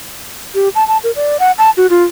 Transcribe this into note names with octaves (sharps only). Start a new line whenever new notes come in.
G4
A5
A5
A#4
D5
F#5
A5
F#4
F4